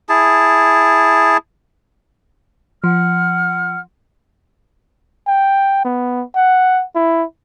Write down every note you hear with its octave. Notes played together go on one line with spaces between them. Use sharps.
E4 G#4 A5
F3 F#5 F6
G5
B3
F#5
E4